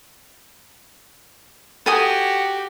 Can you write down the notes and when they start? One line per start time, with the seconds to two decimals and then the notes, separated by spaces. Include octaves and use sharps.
1.86 F#4 G4 A4 G#5 D#6